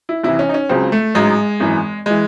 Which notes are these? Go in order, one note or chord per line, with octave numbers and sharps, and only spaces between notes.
E4
C2 C3 E3 E4
C#4
D#4
C#4
C#2 C#3 F#3 C4
A3
A1 G#2 F#3 G#3
G#1 F#2 E3
E3 G#3